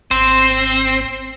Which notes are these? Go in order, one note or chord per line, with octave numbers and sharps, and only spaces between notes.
G#1 C4 C5